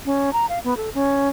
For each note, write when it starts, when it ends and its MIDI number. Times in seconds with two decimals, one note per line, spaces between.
0.05 0.33 61
0.33 0.46 82
0.49 0.59 77
0.64 0.77 59
0.77 0.90 69
0.95 1.29 61